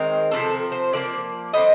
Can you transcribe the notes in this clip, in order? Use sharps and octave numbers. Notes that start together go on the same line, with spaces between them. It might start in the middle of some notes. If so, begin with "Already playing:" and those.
Already playing: D#3 G#3 C4 A#4
C3 F3 G#3 C4 A4
C5
D3 F3 A#3 D5
D3 G3 C4 D#5